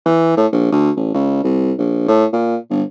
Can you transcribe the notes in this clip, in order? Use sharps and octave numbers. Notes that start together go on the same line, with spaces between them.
E3
A2
A#1
D2
A1
C#2
C2
A#1
A2
A#2
G1